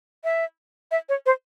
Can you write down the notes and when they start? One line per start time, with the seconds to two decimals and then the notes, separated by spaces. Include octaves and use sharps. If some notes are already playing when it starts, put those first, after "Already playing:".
0.24 E5
0.91 E5
1.09 C#5
1.26 C5